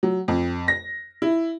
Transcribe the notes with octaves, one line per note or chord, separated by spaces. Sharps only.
F#3
F2
A#6
E4